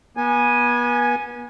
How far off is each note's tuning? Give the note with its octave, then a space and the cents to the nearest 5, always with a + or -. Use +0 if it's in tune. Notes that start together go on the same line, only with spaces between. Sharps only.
B3 -35 G#5 +0